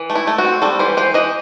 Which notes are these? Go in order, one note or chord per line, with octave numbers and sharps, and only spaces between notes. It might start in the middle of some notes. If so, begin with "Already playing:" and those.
Already playing: E3
A3
E4
A3
F#4
C4
G3 A4
E3 C5
E3 C5
E3 D#5